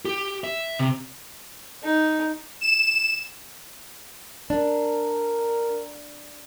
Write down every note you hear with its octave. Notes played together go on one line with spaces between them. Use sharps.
G4
E5
C3
D#4
E7
D4 A#4